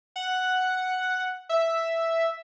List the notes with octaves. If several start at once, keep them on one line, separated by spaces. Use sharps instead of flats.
F#5
E5